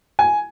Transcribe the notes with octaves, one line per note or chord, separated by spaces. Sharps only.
G#5